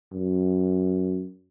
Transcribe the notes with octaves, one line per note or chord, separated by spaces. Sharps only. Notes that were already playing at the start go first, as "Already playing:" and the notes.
F#2